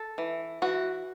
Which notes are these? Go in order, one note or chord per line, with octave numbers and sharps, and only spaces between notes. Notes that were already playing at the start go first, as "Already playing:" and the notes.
Already playing: A4
E3
E3 F#4